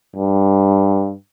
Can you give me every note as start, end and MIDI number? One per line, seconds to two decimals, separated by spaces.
0.16 1.13 43